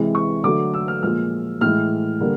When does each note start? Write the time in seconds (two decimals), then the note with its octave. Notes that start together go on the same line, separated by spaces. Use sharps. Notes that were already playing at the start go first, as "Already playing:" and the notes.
Already playing: C3 E3 G#3
0.15 C#6
0.44 D3 F#3 A3 D6
0.74 E6
0.88 F6
1.03 A#2 F3 G#3 F6
1.61 A2 E3 G#3 F6
2.20 D3 G3 A#3